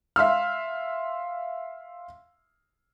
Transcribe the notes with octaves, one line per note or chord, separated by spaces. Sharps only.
E5 F5 C6 E6 F6